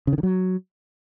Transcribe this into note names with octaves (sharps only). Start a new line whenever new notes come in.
C#3
D#3
D3
F#3